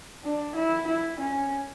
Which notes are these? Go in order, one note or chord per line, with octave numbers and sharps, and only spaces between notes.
D4
E4
E4
C#4